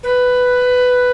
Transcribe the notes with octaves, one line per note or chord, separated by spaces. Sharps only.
B4